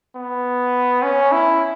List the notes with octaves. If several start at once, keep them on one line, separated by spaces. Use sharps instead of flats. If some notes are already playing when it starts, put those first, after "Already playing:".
B3
C#4
E4